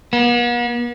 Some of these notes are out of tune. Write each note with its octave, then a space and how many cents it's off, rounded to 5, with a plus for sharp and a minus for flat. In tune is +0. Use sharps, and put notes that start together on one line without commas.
B3 -45